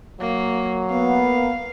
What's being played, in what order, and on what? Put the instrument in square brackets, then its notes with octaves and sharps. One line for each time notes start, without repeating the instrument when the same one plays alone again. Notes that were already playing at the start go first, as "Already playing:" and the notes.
[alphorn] F#3 [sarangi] A#3
[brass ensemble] A#3 B3 [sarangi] F5